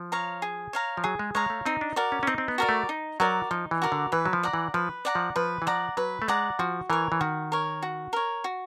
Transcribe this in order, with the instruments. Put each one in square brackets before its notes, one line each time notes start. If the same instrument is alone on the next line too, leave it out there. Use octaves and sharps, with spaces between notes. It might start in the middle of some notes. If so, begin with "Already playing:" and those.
Already playing: [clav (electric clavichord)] F3
[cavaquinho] C#5 F5 A#5
G#4
C#5 F5 A#5
[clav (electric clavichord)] F3
[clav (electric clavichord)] F#3 [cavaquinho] G#4
[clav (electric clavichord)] G#3
[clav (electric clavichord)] G#3 [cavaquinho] C#5 F5 A#5
[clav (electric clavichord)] A3
[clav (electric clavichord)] C4 [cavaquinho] D#4
[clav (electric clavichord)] D4
[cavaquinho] F#4 A#4 D5
[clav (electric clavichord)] C#4
C#4
[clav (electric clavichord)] C4 [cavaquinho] D#4
[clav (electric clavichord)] C4
B3
[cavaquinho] F#4 A#4 D5
[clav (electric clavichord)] A3
[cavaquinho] D#4
[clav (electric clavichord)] F#3 [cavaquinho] F#4 A#4 D5
[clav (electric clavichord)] F3 [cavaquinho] D#4
[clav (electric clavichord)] E3
[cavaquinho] F#4 A#4 D5
[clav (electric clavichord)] D3
[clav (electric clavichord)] E3 [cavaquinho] B4
[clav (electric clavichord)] F#3
F3
[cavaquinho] D5 F#5 A#5
[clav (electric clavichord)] E3
[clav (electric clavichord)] F3 [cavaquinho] B4
[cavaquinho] D5 F#5 A#5
[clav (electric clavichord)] F3
[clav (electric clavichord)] F3 [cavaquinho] B4
[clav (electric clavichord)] E3
[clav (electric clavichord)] F3 [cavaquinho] D5 F#5 A#5
[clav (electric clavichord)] F#3 [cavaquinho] B4
[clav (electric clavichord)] A3
[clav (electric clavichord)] G#3 [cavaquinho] D5 F#5 A#5
[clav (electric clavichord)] F3 [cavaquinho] F#4
[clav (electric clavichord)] E3 [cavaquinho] A#4 C#5
[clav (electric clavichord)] E3
[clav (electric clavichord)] D#3 [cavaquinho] F#4
[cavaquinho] A#4 C#5
F#4
A#4 C#5
F#4